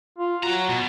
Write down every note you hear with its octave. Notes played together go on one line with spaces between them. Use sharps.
F4
F#3 F#4 A#5
B2